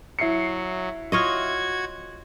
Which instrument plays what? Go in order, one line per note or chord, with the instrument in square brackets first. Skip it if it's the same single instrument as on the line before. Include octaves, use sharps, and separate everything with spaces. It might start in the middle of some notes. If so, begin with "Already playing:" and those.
[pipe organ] F#3 [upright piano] E4 C7 C#7
[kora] F4 C#5 D#5 [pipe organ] F#4 G#6